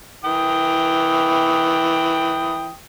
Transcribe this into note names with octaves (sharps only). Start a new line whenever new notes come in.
E3 G5 D#6